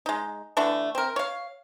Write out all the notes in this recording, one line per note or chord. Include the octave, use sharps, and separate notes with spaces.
G#3 D#4
D3 E3 A3 D4
C4 A#4
C#5 F5